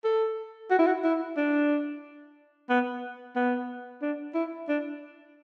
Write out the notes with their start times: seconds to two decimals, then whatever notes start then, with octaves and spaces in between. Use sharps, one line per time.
0.04 A4
0.71 F#4
0.79 E4
0.87 F#4
1.04 E4
1.37 D4
2.69 B3
3.35 B3
4.02 D4
4.34 E4
4.68 D4